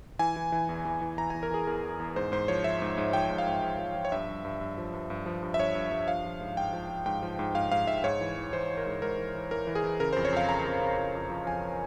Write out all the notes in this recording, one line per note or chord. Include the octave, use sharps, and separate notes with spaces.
E3 G#5
E3
E3
E2
E3
E3
E3 A#5
G#5
E2
A#4
E3 G#4
E2 A#4
E2
E2
G#2 C5
G#2 C5
F3 C#5
F3 E5
G#2
G#2
F3 G5
G#2
F5
G#2
G#2
F3
F3
C#5
G2 E5
G2
G2
G2
F3
G2
G2
F3
G2
E5
G2 C#5
G2
G2
F3 F5
F3
G#2
G#2 G5
F3
F3
G#2 G5
F3
G#2
G#2 F5
G#2 F5
G#2 E5
G#2 C#5
E3
E3
E3 C5
E3
A#4
G#2
G#2 A#4
E3
E3
E3 A#4
E3
G#4
E3
C#3 A#4
C5
F2
C#5
F2 F5
C#3 A#5
F2
C#3
F2
F2
F3
F2 G#5